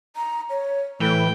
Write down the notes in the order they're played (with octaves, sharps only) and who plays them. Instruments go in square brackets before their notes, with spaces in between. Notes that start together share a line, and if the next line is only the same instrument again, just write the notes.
[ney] A#5
C#5
[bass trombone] A2 [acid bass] E3 [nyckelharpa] G5 [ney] B5